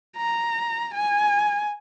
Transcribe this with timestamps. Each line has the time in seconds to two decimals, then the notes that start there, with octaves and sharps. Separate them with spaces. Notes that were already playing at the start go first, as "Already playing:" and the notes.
0.16 A#5
0.94 G#5